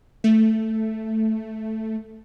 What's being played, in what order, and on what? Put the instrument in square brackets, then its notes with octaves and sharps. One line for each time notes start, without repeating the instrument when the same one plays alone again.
[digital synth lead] A3